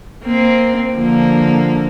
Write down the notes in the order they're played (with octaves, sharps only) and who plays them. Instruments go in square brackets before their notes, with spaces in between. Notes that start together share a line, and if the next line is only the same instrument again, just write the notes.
[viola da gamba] A#3 C4
D3 F3 A#3